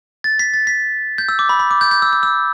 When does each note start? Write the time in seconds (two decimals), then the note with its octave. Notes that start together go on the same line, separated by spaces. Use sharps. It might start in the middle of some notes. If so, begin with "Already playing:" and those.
0.24 A6
0.39 B6
0.54 A6
0.67 B6
1.18 G6
1.29 E6
1.39 D6
1.49 B5
1.59 B5
1.71 D6
1.81 G6
1.91 G6
2.02 E6
2.13 E6
2.23 E6